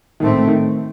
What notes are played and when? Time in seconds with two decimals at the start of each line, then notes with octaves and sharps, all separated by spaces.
0.20 A2 D#3 A3 C4
0.47 D#3